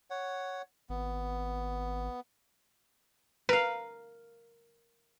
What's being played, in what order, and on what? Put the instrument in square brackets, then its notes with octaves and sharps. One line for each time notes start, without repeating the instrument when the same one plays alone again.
[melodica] C#5 F#5
[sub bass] G#1 [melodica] B3
[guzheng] A#4 F5 [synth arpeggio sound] B4